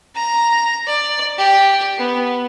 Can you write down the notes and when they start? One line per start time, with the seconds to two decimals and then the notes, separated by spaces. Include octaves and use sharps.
0.15 A#5
0.87 D5
1.38 G4
1.98 B3